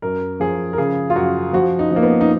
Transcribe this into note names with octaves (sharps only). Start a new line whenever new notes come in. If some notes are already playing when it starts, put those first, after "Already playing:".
F#2 A#4
F3 G#4
A#4
C#3 G#4
F4
F#2 F#4
F3 F#4
D#4
F3
A#3
B3
D#4